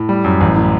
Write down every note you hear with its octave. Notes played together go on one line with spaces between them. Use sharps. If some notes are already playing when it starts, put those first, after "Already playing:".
Already playing: A2
G3
F#2
A1
A2